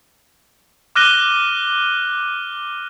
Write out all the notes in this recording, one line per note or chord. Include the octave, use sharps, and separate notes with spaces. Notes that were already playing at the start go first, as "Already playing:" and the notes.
D6 F6 F#6 A#6 D#7 G7